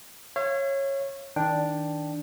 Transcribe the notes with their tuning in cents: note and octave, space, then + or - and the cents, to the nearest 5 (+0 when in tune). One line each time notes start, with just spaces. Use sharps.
C#5 -15 F5 -45
D#3 +20 D4 +0 G5 +0